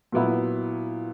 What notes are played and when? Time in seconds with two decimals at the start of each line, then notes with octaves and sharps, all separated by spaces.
0.12 A#2 F#3 B3 E4